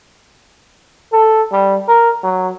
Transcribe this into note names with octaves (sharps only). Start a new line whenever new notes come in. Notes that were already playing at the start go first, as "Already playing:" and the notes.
A4
G3
A#4
F#3